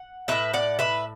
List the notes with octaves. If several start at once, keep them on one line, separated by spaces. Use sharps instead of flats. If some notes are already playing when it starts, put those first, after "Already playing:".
Already playing: F#5
A2 A3 B4 E5
D5 F#5
B4 E5